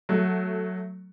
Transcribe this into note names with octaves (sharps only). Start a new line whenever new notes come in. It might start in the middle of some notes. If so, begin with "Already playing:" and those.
F#3 A3